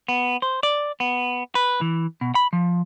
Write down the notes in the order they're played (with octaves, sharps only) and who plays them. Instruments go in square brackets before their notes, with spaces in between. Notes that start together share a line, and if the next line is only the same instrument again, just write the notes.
[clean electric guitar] B3
C5
D5
B3
B4
E3
B2
B5
F3